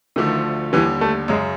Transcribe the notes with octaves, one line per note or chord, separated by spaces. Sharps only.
D2 D3 D#3 F3 A3
D#2 D3 E3 G3
A3
F#2 C#3 F#3 G#3